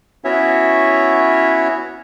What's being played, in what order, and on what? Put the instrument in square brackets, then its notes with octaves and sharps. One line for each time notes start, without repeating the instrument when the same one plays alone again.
[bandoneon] B3 C#4 E4 F#4 C#5 E5